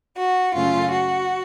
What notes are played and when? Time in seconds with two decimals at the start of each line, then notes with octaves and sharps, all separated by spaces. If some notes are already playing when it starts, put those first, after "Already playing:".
0.16 F#4
0.54 F#2 C#3 A3 C#4 F4
0.92 F#4